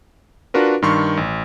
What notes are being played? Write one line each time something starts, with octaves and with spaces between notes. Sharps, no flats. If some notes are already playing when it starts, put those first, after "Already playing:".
D4 F4 F#4 A#4 B4
G2 D#3 C6 C#6
A1